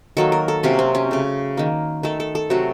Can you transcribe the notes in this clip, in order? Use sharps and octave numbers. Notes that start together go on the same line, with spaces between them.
D#3 F#3 A#3 A4
A#4
A4
C3 F#3 A#3 C#4
C4
C#4
C#3 A3
D#3 A#3
D#3 A3 A4
A4
A4
C3 F#3 A3 F#4